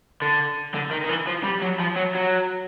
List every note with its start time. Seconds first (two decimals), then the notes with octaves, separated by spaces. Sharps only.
0.22 D3
0.74 D3
0.91 D#3
1.04 D#3
1.09 E3
1.27 F3
1.44 G3
1.62 F#3
1.80 F3
1.96 F#3
2.15 F#3